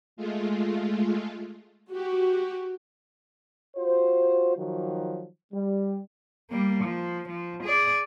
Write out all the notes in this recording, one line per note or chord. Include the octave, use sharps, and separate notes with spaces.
G#3 A3 F4
F#4 G4
F4 F#4 C5
D#3 F3 F#3 F#4
G3
G3 A#3
F3
F3
G#4 D5